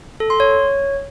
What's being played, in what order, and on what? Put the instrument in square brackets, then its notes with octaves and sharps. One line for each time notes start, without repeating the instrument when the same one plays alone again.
[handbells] A4
C6
C#5